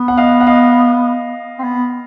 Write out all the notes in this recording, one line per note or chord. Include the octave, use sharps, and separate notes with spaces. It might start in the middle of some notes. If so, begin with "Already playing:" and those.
Already playing: B3
F#5
D#5 F5
F#5
D#5 F5
C4
B3